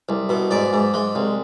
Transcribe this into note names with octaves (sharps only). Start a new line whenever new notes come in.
C2
B2
G#2 D5
G#2
G#3
C2